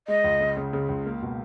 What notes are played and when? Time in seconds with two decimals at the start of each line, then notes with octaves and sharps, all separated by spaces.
0.08 G#3 D#5
0.24 C#2
0.40 C#3
0.57 C#3
0.73 C#3
0.89 C#2
1.06 A#3
1.22 B2